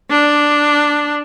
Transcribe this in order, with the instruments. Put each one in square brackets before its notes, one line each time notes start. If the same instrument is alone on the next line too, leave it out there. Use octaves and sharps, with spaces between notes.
[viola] D4